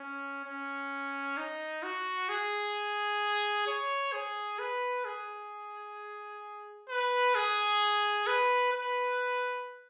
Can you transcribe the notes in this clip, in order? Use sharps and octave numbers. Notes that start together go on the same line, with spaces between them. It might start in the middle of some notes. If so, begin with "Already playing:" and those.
Already playing: C#4
C#4
D#4
F#4
G#4
C#5
G#4
B4
G#4
B4
G#4
B4
B4